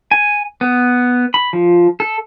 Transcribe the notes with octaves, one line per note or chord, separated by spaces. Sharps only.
G#5
B3
B5
F3
A4